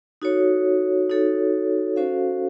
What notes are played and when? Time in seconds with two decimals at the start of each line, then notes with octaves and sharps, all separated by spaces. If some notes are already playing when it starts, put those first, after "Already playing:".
0.22 D#4 F#4 A4 C#5
1.10 D#4 F#4 A4 C#5
1.96 C#4 F#4 A4 C5 F5